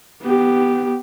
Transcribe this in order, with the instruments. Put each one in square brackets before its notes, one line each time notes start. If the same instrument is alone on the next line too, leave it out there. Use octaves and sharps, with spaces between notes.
[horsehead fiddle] B3 G4